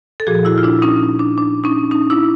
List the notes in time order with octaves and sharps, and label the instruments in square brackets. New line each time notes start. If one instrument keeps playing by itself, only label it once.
[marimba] A4
A#2 F3 F#4 G#4
E4 F#4
F4
D4 E4
C#4 D#4
D4
D4
C#4 D#4
C#4 D#4
D4 E4